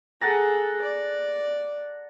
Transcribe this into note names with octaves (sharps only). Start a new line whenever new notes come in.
G#4 A4 F#5 A5 A#5
D5